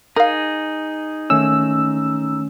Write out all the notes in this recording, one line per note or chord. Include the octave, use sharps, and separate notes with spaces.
D#4 G#4 A#4 F5
D#3 A3 C#4 E6